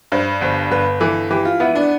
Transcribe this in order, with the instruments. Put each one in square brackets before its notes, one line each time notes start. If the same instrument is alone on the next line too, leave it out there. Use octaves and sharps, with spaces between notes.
[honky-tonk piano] G2 [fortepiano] C5
[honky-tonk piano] G1 [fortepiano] C5
[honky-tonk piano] G1 [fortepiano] B4
[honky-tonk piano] E3 [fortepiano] A4
[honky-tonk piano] E3 [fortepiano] G4
[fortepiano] F4
[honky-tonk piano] B3 [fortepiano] E4
[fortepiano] D4